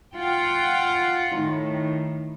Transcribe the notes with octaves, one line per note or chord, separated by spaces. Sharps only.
F4 F#5 G5
A2 D#3